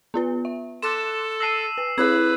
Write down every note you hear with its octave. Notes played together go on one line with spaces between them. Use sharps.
B3 F4 B4
E5
A4 C6 D6 F#6 E7
A5 E6 A#6 C7 D#7
B4
C4 E4 G#4 B4 E6 G#6